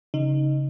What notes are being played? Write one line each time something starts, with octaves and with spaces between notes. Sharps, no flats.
C#3 D#4